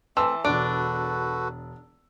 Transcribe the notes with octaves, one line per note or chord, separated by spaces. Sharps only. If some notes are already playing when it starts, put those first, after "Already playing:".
E3 A3 C4 A5 C6 E6
E1 D4 F#4 A4 B4 D7